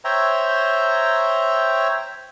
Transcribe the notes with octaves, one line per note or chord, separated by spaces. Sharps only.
C5 C#5 E5 G5 A#5